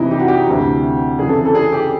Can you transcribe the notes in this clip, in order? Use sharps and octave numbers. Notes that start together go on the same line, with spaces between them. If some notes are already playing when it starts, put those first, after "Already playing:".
Already playing: F2 C3 E3 D#4 E4
G4
F#4
G4
D2 C3 E3
F2 C#3 E3 G#4
A4
A4
G#4
G4